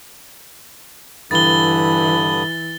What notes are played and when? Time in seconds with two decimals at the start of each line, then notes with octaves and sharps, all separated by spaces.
1.31 G2 D3 E3 B5 D#6 A6 G7